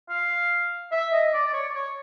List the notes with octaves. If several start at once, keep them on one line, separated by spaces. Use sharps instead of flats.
F5
E5
D#5
D5
D5
C#5
C#5